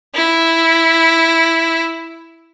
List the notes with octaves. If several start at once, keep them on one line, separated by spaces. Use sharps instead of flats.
E4